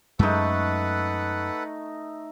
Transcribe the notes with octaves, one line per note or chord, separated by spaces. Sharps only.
F#2 G#3 A3 D#4 A4 B4 F#5